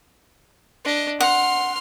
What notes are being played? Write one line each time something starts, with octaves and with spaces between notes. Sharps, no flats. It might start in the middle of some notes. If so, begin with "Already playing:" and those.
D4 D#5
F#5 C6 F6